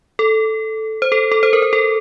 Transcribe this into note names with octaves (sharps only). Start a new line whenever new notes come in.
A4
C5
A4
A4
C5
A#4
C5
A4